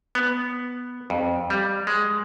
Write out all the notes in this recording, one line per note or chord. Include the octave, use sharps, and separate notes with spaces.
B3
F2
G3
G#3